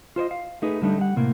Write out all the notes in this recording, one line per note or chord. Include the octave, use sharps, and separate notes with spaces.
F4 C5 C#5 D#5
F5
A3 D#4 G#4 B4
D3 G3 A3 D4 D#4
G3 F#5
A2 C3 A#3